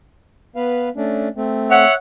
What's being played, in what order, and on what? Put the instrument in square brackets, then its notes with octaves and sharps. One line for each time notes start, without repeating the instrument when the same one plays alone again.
[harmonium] B3 B4 F5
A3 C#4 D4
A3 C4
[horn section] C#5 E5 F#5